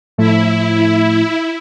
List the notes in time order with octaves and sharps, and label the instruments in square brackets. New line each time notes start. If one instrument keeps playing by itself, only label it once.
[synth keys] A2 F3 A3 [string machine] E4